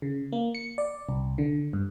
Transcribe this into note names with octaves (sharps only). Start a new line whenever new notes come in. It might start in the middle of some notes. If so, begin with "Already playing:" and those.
C#3
A#3
C#7
D5
C2
D3
G2